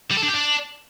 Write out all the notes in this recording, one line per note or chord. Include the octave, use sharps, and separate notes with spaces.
G3
A4
D4
G4
D4